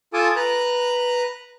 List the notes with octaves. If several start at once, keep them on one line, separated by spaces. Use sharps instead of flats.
F4 A4 G#5 A5 D6 D#6
B4 A#5 F#6